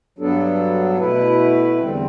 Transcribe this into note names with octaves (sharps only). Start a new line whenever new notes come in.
G2 F#3 B3 D4 A4
B2 A3 E4 B4
E2 D3 G3 C4